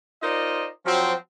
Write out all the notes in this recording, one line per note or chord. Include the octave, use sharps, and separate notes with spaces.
D#4 F4 A#4 C5 D5 D#5
F3 F#3 C4